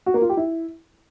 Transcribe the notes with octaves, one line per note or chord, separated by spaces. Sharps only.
F#4
A#3
F4
G4
E4